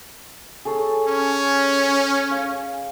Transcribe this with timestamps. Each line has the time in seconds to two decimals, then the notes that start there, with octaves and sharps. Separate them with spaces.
0.65 G#4 A4 C#5
1.08 C#4
2.31 F5